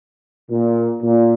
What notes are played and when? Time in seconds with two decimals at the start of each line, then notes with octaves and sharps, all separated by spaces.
0.51 A#2
1.03 A#2